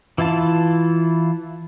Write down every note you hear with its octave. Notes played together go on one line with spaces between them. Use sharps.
E3 E4 F4 A5